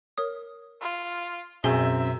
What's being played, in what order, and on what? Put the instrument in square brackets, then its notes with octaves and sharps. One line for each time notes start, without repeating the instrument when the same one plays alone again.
[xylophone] A#4 C#5 D#6
[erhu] F4
[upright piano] F#2 C4 [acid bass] B2 [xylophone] G#4 G#5 G7 [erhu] E5